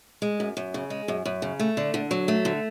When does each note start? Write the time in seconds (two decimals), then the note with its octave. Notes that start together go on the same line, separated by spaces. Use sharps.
0.22 G#3
0.40 F#2
0.57 F#2
0.74 C#3
0.90 G#3
1.08 F#2
1.25 F#2
1.42 C#3
1.60 A3
1.77 D3
1.94 D3
2.11 F#3
2.28 A3
2.45 D3